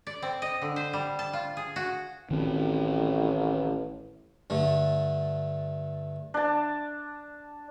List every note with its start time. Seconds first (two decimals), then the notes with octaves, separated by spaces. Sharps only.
0.07 D5
0.22 C4
0.42 D#5
0.62 D3
0.76 C5
0.93 G3
1.19 A5
1.33 F4
1.57 G#4
1.76 F#4
2.31 A1 D#3 C4
4.50 G2 D3 A3
6.34 D4 A5